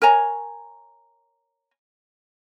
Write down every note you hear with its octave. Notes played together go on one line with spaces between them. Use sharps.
A#4 C#5 G#5 A#5